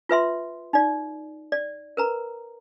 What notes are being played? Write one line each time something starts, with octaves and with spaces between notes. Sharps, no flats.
F4 B4 E5 C6
D#4 D5
D5
A#4 B4 A#5